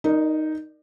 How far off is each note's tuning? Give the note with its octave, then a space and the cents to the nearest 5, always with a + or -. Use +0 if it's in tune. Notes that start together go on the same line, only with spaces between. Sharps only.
D#4 +0 A#4 +0 D5 +30